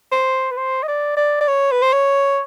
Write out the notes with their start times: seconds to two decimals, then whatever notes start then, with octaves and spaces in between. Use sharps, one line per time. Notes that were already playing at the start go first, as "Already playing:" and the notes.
0.12 C5
0.52 B4
0.57 C5
0.83 D#5
0.88 D5
1.17 D5
1.41 D5
1.48 C#5
1.72 B4
1.82 C5
1.93 C#5